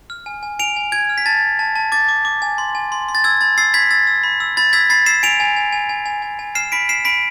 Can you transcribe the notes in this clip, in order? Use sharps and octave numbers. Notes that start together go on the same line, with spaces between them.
F6
G#5
G#5
G#5 D7 F7
G#5
G#5 G#6
F6
B6
A5 A6
A5
A5
A5
D6 A6
D6
D6
G#5
C6
G#5
C6
C6
A6
E6 G#6
B5 A6
E6 A6 C7
B5 G#6 B6
E6 A6
E6
B5
E6
B5 A6
E6 G#6 B6
B5 A6 C7
E6 C7 E7
G#5 D7 F7
G#5
G#5
G#5
G#5
G#5
G#5
G#5
F6 C7 E7
B5 B6 D7
F6 C7 E7
B5 B6 D7